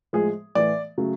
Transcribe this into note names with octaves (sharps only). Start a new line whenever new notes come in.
A2 F3 G#3 G#4
A2 E3 A3 D5
C#3 F#3 A3